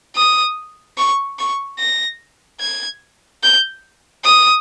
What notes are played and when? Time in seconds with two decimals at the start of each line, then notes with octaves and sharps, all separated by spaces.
0.16 D#6
0.97 C#6
1.39 C#6
1.79 A#6
2.61 G#6
3.44 G6
4.24 D#6